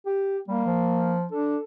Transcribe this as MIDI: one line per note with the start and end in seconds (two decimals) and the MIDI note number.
0.06 0.38 67
0.48 0.65 55
0.48 1.16 58
0.66 1.27 53
1.32 1.57 62
1.32 1.64 69